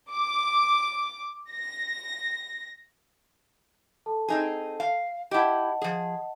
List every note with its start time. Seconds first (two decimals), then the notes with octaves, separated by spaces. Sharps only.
0.11 D6
1.51 A#6
4.06 A4 A5
4.28 C4 D#4 G#4
4.80 F5
5.31 E4 G4 D#5 F#5 A5
5.82 F3 G#4